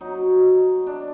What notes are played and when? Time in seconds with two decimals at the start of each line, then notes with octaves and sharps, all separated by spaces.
0.01 B2 F#3 D#4
0.87 D4